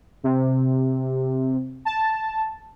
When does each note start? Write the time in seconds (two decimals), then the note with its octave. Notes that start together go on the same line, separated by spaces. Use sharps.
0.24 C3
1.85 A5